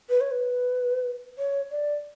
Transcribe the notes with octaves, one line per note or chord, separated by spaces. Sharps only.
B4
C#5
B4
C#5
D5